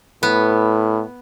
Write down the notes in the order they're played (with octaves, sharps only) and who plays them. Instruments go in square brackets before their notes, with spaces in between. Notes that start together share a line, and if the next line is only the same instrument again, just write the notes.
[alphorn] A2 [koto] B3